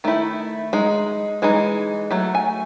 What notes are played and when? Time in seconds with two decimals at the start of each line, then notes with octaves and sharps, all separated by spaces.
0.04 D#3 A3 E4
0.73 G#3 D#4
1.42 E3 G#3 D#4
2.11 F#3 A3
2.35 G#5